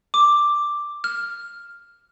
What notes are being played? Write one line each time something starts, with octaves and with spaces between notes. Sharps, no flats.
D6
F6